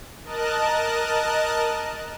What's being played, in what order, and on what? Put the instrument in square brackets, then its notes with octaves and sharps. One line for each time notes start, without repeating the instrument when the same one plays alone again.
[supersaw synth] A#4 D#5 A5 F#6